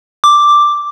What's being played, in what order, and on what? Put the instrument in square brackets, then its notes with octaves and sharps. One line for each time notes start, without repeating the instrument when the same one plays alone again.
[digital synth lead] D6